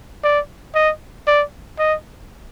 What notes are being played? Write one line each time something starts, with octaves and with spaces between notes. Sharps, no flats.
D5
D#5
D5
D#5